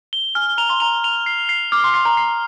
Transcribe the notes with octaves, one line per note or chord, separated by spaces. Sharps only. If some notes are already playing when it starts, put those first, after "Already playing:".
G7
G#5 F6
A#5 F7
C6
A#5 F7
F7
C7
C7
D6 F6
C6
C6 C7
A#5
C7